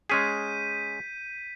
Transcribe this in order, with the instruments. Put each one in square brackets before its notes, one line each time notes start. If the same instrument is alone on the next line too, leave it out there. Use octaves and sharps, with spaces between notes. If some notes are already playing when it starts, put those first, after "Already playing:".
[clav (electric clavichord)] G#3 C#4 G#4 [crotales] G6 B6 D#7